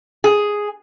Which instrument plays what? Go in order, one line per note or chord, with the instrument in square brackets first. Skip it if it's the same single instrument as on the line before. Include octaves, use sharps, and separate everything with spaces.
[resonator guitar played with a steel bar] G#4